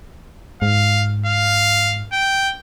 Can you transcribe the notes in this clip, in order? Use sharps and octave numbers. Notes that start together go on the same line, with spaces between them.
G#2 F5
F5
G5